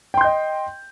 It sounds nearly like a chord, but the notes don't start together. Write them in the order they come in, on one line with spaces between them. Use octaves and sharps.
G5 C6 G6 D#5